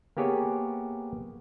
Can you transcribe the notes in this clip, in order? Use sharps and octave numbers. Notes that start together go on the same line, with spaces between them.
A#3 B3 G4 G#4 C#5